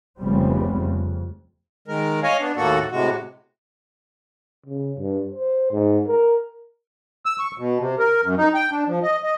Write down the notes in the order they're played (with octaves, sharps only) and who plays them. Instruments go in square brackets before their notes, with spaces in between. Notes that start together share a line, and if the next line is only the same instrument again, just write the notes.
[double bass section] F1 C#2 C#3 G3 B3 C4
F2
[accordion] D#3 G#3 A#4
C#5 D#5 F5 G#5
B3 D4
D#2 A2 A#3 F#4 A4 F#5
A2 C3 G#3 F#4
[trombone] C#3
G2
C5
G#2
A#4
[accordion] E6
C#6
B2
C3
A#4
F#2
D#4
G5
D4
F3
D#5
D#5